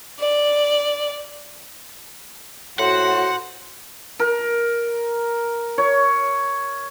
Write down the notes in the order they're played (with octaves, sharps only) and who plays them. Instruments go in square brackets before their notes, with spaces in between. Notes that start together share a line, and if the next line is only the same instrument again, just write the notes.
[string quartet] D5
[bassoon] A2 [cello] F#4 [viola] C5 [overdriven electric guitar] F#5
[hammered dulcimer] A#4
C#5